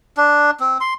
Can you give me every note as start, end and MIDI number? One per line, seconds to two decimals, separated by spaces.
0.17 0.51 62
0.60 0.78 60
0.81 0.94 84